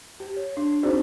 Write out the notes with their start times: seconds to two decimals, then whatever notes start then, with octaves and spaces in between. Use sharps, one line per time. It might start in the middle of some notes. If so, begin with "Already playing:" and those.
0.20 G4
0.37 C#5
0.57 D4
0.83 C4 D#4 F#4 G#4 C5 D5